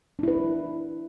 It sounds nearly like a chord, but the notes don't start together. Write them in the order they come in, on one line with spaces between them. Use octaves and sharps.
D4 E4 B4